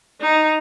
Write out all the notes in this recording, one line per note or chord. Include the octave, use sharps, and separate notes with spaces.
D#4